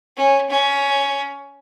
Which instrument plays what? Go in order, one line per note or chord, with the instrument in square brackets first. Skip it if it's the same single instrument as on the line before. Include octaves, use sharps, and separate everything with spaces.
[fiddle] C#4
C#4